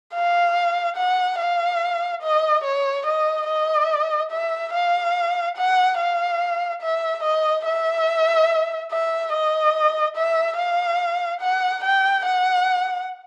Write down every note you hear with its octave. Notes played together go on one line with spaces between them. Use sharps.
F5
F#5
F5
D#5
C#5
D#5
D#5
E5
F5
F#5
F5
E5
D#5
E5
E5
D#5
E5
F5
F#5
G5
F#5